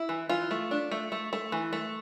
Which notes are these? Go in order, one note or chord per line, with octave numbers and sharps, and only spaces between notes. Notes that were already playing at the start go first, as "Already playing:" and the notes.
Already playing: E4
E3
E3 F4
A3
D4
A3
A3
A3
E3
A3